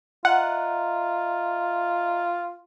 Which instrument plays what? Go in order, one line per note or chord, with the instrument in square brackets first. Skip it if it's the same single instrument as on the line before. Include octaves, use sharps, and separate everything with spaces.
[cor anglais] F4 [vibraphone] D#5 E5 A#5 [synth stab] F#5